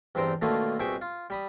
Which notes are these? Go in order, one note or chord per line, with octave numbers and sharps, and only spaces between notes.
E2 G2 C4 C5 G5 A#5
B2 D3 D#3 A3 A#3 F4
C2 B2 G#4 E5 G5 C#6
F4
G3 B5 D#6